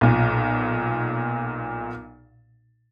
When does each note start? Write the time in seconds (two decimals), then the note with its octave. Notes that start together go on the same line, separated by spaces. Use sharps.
0.01 B1 A#2